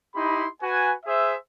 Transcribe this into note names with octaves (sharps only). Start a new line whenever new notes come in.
D#4 E4 G4 B5 C6
F#4 B4 G#5
G#4 C5 E5